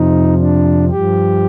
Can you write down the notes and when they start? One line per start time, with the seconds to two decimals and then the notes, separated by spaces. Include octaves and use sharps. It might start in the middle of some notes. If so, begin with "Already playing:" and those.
Already playing: F2 C3 F3 D#4
0.39 D4
0.91 G2 F3 G4